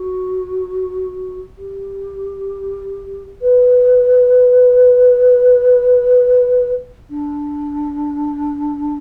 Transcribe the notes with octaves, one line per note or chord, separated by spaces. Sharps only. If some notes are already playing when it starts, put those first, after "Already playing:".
Already playing: F#4
G4
B4
D4